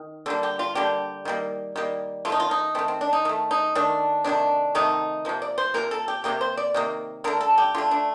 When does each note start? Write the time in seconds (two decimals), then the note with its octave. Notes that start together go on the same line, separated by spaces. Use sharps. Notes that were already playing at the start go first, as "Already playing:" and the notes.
Already playing: D#3
0.26 D3 G3 A#3 A4
0.43 G4
0.59 F4
0.75 D3 G3 A#3 G4
1.25 D#3 G3 A#3
1.76 D#3 G3 A#3
2.25 A3 F4
2.30 D#3 D#4
2.40 F4
2.51 D#4
2.75 D#3 A3 C4
2.88 C4
3.01 D4
3.13 D#4
3.25 D#3 A3
3.51 D#4
3.75 D#3 A3 D4
4.24 C3 D#3 A3 D4
4.75 C3 D#3 A3 D#4
5.25 C3 F3 A#3
5.42 D5
5.58 C5
5.74 C3 F3 A#3 A#4
5.91 A4
6.08 G4
6.24 C3 D#3 A#3 G4
6.41 C5
6.57 D5
6.74 C3 D#3 A#3
7.24 D3 A3 A#4
7.41 A4
7.58 G4
7.75 D3 A3 F4
7.91 D4